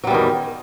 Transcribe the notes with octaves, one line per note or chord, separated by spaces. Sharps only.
E2 D#3 F#3 G3